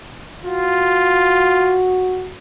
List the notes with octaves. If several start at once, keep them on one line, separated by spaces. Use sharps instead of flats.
F4 F#4